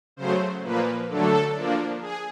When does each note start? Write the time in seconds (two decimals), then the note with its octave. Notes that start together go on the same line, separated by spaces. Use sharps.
0.16 C#3 F#3 A3 C5
0.63 A#2 F3 A#3 B4
1.09 D3 F#3 A3 D4 A4
1.56 F3 A#3 D4
2.01 G#4